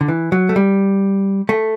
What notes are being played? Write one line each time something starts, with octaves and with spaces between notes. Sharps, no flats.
D3
E3
F#3
A3
G3
A3